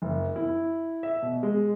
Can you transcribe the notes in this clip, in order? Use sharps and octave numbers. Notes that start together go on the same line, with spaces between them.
F#1
E4
E5
B2
G#3